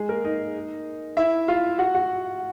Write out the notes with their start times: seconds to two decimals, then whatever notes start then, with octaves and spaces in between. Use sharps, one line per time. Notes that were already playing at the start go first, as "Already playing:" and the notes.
Already playing: G#3 G#4
0.09 A#3 A#4
0.25 D#4 D#5
1.17 E4 E5
1.48 F4 F5
1.78 F#4 F#5
1.94 F#4 F#5